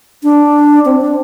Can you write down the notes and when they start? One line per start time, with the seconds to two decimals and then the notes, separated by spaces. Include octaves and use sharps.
0.23 D4
0.85 C4
1.01 D4